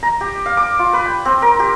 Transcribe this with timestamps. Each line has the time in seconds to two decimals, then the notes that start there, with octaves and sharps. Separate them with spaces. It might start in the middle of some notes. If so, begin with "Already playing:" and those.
0.03 A#5
0.21 G4
0.46 F5
0.57 D6
0.79 F4
0.93 B4
1.06 G5
1.25 C4
1.42 A#4
1.59 G4